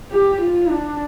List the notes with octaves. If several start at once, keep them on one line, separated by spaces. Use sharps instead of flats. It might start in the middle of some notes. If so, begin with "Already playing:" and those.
G4
F4
D4